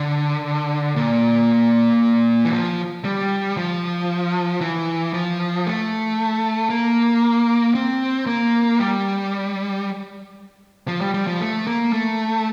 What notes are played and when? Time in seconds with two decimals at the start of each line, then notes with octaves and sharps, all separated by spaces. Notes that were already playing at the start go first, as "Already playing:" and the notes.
Already playing: D3
0.96 A#2
2.45 E3
2.53 F3
3.05 G3
3.57 F3
4.61 E3
5.14 F3
5.66 A3
6.70 A#3
7.75 C4
8.26 A#3
8.79 G3
10.88 F3
11.01 G3
11.14 G3
11.27 F3
11.41 A3
11.67 A#3
11.93 A3